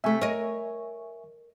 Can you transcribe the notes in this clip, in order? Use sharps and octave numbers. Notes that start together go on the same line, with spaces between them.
C3 A3 E5 G#5 C#6
A#4 C#5 D#5